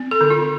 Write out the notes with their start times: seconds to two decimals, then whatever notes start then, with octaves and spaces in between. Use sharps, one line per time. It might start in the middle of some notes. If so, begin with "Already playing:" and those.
Already playing: C4
0.11 A4
0.21 D3
0.30 F4